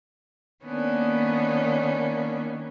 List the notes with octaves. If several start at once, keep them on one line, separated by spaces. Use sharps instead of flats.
D#3 A#3 B3 C#4 D4